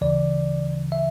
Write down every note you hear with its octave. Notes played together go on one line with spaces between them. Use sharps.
D2 C#3 E3 D5
E5